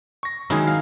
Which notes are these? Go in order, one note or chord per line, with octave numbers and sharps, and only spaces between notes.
C#6 A#6
D#3 F#3 G#3 D#4 E4 G#4
F5